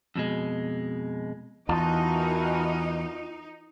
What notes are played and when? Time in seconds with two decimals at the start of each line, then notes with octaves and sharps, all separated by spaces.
0.16 F2 B2 G#3
1.69 E2 E3 D#4 F4 F#4 A#4 F5 A5